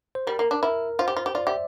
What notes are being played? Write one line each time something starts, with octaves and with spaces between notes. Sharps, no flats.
C5
G3 A#4
A#3
D4
E4 A#4
F4 C5
G4
F4
G4
F4 D5
G4 E5